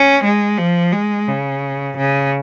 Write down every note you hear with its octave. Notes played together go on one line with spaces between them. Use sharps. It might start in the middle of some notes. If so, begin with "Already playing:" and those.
Already playing: C#4
G#3
F3
G#3
C#3
C#3